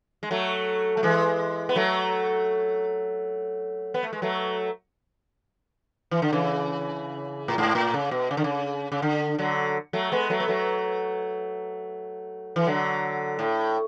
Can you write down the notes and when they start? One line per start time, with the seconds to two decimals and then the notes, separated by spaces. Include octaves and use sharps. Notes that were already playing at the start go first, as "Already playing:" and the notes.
0.23 G#3
0.31 F#3 A3
0.97 A3
1.03 E3 G#3
1.69 B3
1.76 F#3 A3
3.94 B3
4.03 A3
4.13 G#3
4.22 F#3 A3
6.11 E3
6.22 D3
6.33 C#3 E3
7.48 A2
7.58 G#2
7.75 A2
7.94 C#3
8.11 B2
8.31 C#3
8.37 D3
8.44 C#3
8.92 C#3
9.02 D3
9.39 D3 F#3
9.93 F#3 A3
10.12 G#3 B3
10.30 F#3 A3
10.40 B3
10.48 F#3 A3
12.56 E3
12.67 D3 F#3
13.39 A2